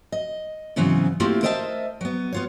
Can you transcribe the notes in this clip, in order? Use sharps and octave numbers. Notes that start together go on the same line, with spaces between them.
D#5
G#2 C#3 E3 F#3 B3 C4
A3 A#3 C4 E4 F4 G4
A#4 C5 D#5 E5 F#5 A5
F#3 B3
B3 F4 C#5